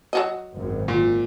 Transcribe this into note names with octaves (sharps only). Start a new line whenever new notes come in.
F#3 F#4 D#5
G#1 F#2
A#2